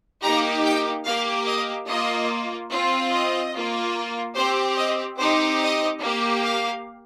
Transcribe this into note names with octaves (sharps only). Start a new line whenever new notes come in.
A#3 D#4 G4 A#5
G5
A#3 G4 F5
D#5
A#3 F4 D#5
C4 F4
D#5
A#3 F4
C4 G4 C5
D#5
C4 D#4 G4 C5
D#5
A#3 G4
F5